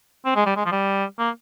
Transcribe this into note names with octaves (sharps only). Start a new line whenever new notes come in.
C4
G#3
G3
G#3
F3
G3
A#3